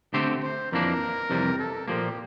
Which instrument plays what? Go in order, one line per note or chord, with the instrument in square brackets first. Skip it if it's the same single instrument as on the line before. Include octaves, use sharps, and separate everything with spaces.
[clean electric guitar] D3 A3 C4 G4 C5
[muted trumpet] C5
[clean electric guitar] F2 E3 A#3 D4 [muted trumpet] A#4
[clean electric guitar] F2 C3 E3 G3
[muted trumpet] A4
[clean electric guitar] A#2 F3 A#3 [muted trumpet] G4